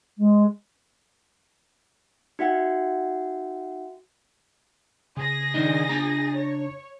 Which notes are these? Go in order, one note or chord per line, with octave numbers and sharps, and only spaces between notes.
G#3
D#4 F#4 E5 F#5 G5
C#3 G#4 A#6
D#3 D4 D#4
D4 A#5
C#5